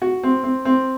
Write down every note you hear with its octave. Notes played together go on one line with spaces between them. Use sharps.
F#4
C4
C4
C4